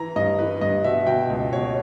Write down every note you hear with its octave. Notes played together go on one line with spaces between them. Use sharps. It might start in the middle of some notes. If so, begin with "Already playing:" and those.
Already playing: E3 A#5
G2 D#5
E3 B4
G2 D#5
B2 E5
B2 G5
C#2
B2 C#5